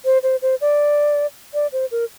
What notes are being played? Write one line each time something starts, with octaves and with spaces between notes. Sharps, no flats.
C5
C5
C5
D5
D5
C5
A#4